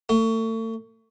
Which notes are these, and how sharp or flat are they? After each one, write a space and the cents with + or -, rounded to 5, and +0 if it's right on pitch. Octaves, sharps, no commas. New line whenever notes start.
A3 +35